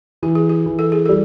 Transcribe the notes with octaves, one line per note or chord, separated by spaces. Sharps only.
E3 G4
G#4
G4
E3
A4
G#4
G3 A4